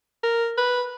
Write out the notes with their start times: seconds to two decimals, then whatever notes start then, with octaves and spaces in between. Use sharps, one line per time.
0.23 A#4
0.57 B4